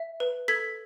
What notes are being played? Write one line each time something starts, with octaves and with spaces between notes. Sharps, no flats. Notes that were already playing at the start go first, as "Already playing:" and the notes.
Already playing: E5
B4
A4 G#6 B6